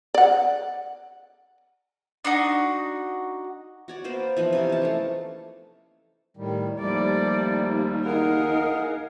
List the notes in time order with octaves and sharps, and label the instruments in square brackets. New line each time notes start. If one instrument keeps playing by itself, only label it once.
[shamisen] D5 F#5
[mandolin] D4 D#4 F#4
[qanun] F#4 C#5 D5
A#3 B3 C5 F5
E3 F3 B3 D#4
C3 C#4
C#5 A5
A3 A#3 A4
[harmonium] A2 D#3 G3
[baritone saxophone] D#2 [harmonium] F3 A3 A#3 [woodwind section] G3 [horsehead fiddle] D5
[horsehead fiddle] D#4 A#4 [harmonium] G#4 F5 F#5